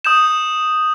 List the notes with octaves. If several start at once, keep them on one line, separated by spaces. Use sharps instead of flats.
D#6 G6 E7